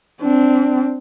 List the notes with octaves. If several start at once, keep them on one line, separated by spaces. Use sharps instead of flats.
C4 D4